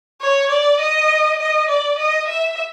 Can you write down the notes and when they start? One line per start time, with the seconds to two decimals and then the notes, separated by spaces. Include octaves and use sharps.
0.21 C#5
0.50 D5
0.80 D#5
1.39 D#5
1.69 D5
1.99 D#5
2.28 E5